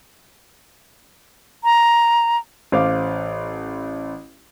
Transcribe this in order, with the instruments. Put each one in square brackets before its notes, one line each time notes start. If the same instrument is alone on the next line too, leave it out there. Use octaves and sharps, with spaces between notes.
[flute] A#5
[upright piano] A1 C5 F5 D6